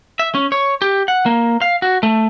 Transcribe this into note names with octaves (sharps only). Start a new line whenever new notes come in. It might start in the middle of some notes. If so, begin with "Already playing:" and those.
E5
C#4
C#5
G4
F#5
A#3
F5
F#4
A3